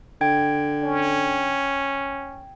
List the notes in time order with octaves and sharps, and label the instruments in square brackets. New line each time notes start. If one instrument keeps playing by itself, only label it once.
[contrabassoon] D3 [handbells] G5 G#6
[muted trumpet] C#4